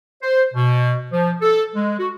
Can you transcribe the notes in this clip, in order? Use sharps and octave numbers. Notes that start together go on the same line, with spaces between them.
C5
B2
F3
A4
G#3
F#4